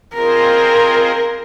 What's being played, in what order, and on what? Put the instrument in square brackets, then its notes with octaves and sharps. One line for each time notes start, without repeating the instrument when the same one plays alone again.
[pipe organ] C4 F4 G#4 C5 D#5 [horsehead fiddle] A#4